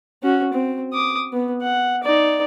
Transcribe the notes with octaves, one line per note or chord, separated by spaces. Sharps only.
C#4 F#4
C4
D6 D#6
B3
F#5
D#4 D5